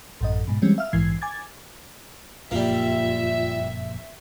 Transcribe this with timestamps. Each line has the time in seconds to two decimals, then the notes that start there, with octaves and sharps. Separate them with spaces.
0.21 A1 F#2 D#5
0.47 G#2 B2
0.62 E3 G3 G#3 C4 C#4
0.78 E5 F5 F6
0.93 A#1 G#2 E3 G#6 C7
1.21 G#5 D6 G#6 A6
2.51 F#1 F2 A#2 G3 A#3 F4 E5